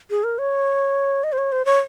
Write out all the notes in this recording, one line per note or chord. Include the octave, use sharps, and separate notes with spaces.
G#4
A#4
C#5
D#5
C5
C#5
C5
C#5